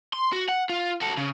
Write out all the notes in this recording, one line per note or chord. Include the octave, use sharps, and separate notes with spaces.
C6
F#4
F#5
F4
F#4 A4
C#3